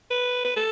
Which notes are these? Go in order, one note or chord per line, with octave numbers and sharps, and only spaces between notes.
B4
B4
A4